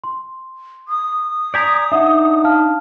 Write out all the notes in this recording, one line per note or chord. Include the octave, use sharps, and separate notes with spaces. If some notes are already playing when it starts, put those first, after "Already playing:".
C6
D#6
D5 G#5 A#5 G6 B6
D4 D#4 E5 F#5
F5 A5 F6